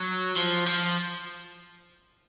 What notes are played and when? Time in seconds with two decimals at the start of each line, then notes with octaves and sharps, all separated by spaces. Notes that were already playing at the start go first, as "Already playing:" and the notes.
Already playing: F#3
0.36 F3
0.67 F3